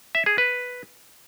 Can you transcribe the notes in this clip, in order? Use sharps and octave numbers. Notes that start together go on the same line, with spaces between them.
E5
G#4
B4